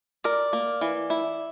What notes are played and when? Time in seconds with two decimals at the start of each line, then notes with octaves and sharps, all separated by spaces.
0.24 A#4 D5
0.53 A#3
0.81 E3
1.10 E4